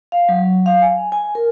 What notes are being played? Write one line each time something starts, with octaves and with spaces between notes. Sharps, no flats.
F5
F#3
F5
G#5
G#5
A#4